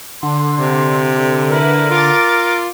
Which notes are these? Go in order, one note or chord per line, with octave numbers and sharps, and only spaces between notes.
D3 C6
C3
E4 A#4 B4
F4 D6 A6